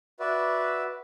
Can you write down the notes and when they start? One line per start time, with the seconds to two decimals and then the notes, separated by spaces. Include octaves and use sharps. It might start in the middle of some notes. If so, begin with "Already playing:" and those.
0.20 F#4 B4 D5 E5